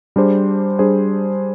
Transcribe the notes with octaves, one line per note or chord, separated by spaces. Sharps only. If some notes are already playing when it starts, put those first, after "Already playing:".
G3 D4 G#4 C5
G3 D4 G#4 C5